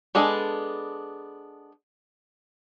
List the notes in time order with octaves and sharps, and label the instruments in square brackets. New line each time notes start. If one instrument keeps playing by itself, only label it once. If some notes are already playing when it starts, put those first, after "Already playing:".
[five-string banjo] G#3 B3 D4 G#4 A4